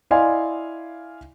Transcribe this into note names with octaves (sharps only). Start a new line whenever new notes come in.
E4 D5 D#5 F5 G#5 C6